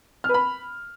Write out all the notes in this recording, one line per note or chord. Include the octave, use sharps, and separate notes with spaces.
F6
B4
B5